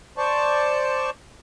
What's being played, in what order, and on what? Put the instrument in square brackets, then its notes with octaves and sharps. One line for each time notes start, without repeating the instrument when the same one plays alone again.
[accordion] C5 D5 A5 C#6